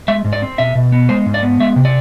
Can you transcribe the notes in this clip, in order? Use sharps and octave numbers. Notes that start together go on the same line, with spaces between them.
G#3 E5
G#2
D5
C4
B2 E5
B2
B3
G#3 C5
G#2
D5
B3
G#3 E5
C3
D5